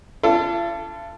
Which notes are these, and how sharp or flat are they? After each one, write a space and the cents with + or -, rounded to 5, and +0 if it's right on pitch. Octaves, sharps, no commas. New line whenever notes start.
D4 -30 F4 -45 A4 +0